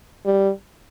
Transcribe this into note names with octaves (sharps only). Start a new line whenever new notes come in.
G3